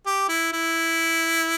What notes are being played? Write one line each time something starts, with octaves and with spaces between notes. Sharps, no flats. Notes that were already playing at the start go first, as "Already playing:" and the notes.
G4
E4
E4